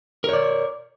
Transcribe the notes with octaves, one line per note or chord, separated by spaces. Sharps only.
A#4 C#5 D5